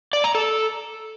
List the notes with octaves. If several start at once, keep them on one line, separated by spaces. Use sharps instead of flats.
D5
A#5
A4